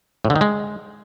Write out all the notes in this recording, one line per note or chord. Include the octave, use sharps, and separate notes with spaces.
A2
D3
D#3
G#3